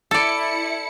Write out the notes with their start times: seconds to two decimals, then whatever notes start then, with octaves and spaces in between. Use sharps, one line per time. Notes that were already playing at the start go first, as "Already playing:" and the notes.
0.11 E4 A4 D5 C#7